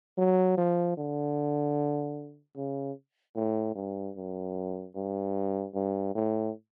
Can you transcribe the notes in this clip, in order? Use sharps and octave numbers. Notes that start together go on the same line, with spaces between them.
F#3
F3
D3
C#3
A2
G2
F#2
G2
G2
A2